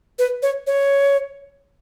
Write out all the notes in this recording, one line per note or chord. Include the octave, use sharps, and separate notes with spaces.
B4
C#5
C#5